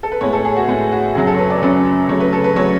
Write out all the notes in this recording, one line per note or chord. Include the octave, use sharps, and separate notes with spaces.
A4
B4
A2 G#3 B3 C#5
A4
G#4
F#4
A2 G#3 B3
F#4
F#2 C#3 F#3 C#4 G#4
A4
C#5
B4
D5
F#2 C#3 F#3 C#4 D5
C#3 F#3 A3 C#5
B4
A4
B4
C#3 F#3 A3 C#5